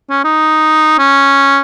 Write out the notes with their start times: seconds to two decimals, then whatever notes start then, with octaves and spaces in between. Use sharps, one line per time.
0.10 C#4
0.24 D#4
0.99 C#4